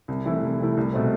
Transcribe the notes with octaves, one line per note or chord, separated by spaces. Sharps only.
C2
C3 E3 A3 E4
C2
C3 E3 A3 E4
C2
B2 A3 C4